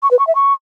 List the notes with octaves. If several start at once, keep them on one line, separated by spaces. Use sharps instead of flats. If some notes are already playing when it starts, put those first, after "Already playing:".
C#6
B4
C#6
E5
C#6